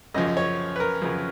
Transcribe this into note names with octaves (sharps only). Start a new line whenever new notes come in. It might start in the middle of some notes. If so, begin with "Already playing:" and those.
F#2 C#3 F3 D#5
D#5
C#5
B4
A#4
F#2 C#3 F3